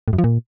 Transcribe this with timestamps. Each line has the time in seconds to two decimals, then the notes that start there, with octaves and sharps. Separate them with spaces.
0.08 A2
0.13 F#2
0.18 F3
0.24 A#2